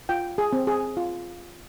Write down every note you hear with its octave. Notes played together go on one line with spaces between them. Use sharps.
F4 G5
G#4
C4
G#4
F4